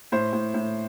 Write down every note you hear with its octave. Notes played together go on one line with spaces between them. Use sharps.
A2 C5
A2
A2